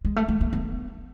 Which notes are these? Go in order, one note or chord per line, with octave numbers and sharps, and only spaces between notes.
G#3
A3
A3
A#3
B3